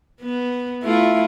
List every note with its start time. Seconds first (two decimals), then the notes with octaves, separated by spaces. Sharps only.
0.21 B3
0.84 A3 E4 F4